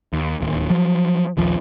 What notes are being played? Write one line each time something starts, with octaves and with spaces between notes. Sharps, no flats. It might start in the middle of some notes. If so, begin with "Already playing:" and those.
D#2
D1 D#2
F3 F#3
A#1 D#2 F3